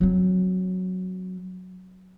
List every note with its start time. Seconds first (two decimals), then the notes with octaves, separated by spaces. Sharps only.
0.01 F#3 C4